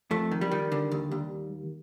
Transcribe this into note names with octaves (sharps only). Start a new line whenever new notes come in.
F2 A3
D#3
G3
D#3
D3
D#2
D#2